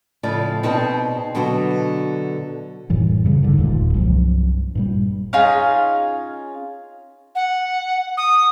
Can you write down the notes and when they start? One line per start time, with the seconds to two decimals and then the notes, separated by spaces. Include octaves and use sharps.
0.23 A2 C#3 F3 D5
0.63 B2 C4 D#4 G#4 A5
1.35 B2 D3 F#3 F#4
2.89 F#2 A2 E3 G3
3.25 G2 C#3 G3
3.43 B1 G2 D3 D#3
3.57 E1 D#2 A#2 G#3
3.94 C2 G2 F3 F#3
4.75 G2 A#2 G3
5.33 C#4 D#4 F4 G#4
7.35 F#5
8.17 D#6